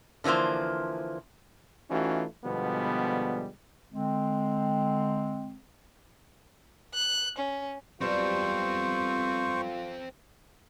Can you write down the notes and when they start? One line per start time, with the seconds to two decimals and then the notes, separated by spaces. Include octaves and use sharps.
0.24 D3 E3 F3 A#3 C5
1.90 E3 A3 C#4 D#4 F4 F#4
2.45 B2 D3 F3 G3 G#3 B3
3.92 D3 G#3 C4
6.95 F#6
7.38 C#4
8.01 F#3 G3 B3 C4 F4 A4 C5 C#6